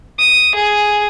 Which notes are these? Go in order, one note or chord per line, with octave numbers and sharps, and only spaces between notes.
D#6
G#4